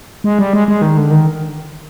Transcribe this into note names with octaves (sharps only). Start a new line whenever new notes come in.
G#3
G3
G#3
G#3
D#3
D3
D#3